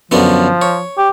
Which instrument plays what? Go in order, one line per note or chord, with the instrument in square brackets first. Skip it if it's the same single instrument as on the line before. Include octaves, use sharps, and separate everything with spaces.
[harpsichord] F#2 D3 B3 [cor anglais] F3
[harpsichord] C#5
[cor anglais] G4